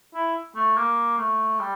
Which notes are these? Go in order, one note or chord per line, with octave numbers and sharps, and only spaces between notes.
E4
A3
A#3
A3
G3